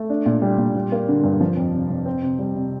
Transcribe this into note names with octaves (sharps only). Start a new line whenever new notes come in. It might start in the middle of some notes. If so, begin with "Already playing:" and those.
Already playing: A3
D4
A#2
G3
A#2
G3
A#3
D3
G2
F3
F2
C3
F2
C4
C3
G3
C3